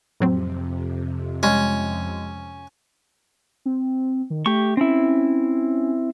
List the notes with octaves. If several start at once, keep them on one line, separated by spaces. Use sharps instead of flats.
F2 A2 C3 F#3 C4
G3 G#3 C#4
C4
D#3
A3 G4 C#6
C4 C#4 E4